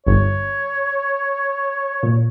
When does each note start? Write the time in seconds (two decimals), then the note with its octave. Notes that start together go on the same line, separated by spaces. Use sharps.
0.07 G1 C#5
2.03 A#2